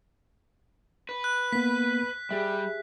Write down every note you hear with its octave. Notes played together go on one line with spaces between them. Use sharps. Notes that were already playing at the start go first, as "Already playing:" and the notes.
B4
F#6
A#3 B3 B6
G3 G4 G#4 E5